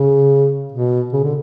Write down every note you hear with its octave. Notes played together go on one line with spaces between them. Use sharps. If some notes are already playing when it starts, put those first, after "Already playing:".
Already playing: C#3
B2
C#3
D3